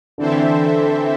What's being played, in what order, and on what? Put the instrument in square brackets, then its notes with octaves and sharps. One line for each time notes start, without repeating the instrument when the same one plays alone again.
[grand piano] D3 [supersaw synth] E3 C4 A4 C5 E5